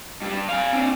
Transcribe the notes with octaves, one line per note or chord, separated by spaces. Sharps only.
G2 G3
F5 G#5
C4 D4